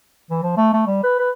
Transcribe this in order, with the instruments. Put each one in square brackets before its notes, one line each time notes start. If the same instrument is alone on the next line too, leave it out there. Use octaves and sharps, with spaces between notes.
[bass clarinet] E3
F3
A3
A3
G3
B4
B4